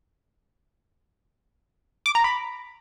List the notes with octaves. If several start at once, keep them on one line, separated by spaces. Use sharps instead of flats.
D6
A#5
B5